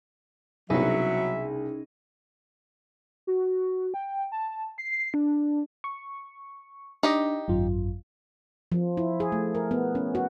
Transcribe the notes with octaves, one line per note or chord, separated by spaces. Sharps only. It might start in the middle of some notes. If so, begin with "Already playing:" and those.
C2 B2 F#3 C#4 D#4 G#4 E5
F#4
G5
A5
C7
D4
C#6
D4 D#4 G4 D#5
G#1 F#2 F4
F3
E4
G#4
A3
A#4
B3
C#4
F#4